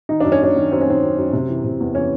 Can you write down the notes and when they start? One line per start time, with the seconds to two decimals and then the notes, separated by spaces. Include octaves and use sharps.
0.09 D#3 D#4
0.20 F#2 D4
0.32 C#4
0.41 F#2 D4
0.56 D#3
0.72 F#2 C4
0.81 C#4
0.87 D#3 C4
1.02 F#2
1.18 F#2
1.33 C3
1.48 E3
1.64 C3
1.80 E2
1.95 E3 C#4